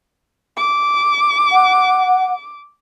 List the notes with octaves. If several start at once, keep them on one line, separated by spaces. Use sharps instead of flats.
D6
F#5